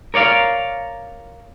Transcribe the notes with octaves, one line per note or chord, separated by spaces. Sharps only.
A#4 C#5 D5 F5